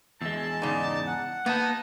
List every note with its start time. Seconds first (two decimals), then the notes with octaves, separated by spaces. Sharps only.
0.22 E2 G#3 A5 E6
0.62 G#2 C#3 D#4 D5
1.07 F#5
1.46 A#3 B3 D#4 A5